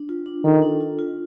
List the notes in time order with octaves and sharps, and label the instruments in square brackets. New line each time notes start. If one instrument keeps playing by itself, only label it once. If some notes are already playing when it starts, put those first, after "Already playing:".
Already playing: [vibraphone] D4
F4
D4
[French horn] D#3 [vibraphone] A4
[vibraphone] D4
F4
F4